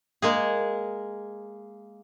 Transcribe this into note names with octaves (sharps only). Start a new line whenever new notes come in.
G#3 A#3 G#4